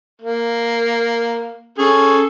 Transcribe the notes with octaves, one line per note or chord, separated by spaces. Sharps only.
A#3
C#4 G#4 A4